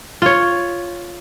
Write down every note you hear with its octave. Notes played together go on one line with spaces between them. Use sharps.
F4 C#5